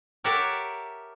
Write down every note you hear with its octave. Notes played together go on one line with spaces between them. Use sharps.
G4 A#4 C#5 E5 F#5 A5